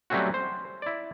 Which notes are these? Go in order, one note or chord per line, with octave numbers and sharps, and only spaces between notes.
F#3 G3 A3 C4 C#4 F#4
C5
E4 D5